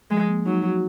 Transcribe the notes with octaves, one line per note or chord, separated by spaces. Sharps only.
F3 G#3
A#3
F#3 D#4
F#4